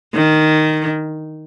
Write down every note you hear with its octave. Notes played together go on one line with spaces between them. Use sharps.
D#3